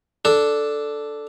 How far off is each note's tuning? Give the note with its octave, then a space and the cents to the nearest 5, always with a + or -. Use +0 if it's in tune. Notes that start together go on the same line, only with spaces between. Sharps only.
D4 +0 A4 +0